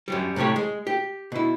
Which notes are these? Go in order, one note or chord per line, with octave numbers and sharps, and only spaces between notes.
F#2 F#3 G3
A2 C3 A3 G4 C#5
G#3
G4
B2 E4